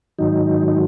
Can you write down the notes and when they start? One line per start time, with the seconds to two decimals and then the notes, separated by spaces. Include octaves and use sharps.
0.18 G#2 D#3 F#3 D#4
0.68 D#4